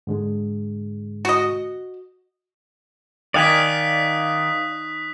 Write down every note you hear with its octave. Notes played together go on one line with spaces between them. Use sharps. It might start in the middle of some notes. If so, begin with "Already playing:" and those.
G#2 D3 G#3
F#4 D#5
D#3 D5 F5 G#5 D#6 F#6 B6